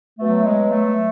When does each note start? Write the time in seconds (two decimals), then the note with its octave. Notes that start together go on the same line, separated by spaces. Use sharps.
0.19 B2 F#3 A3
0.44 G#3
0.69 A3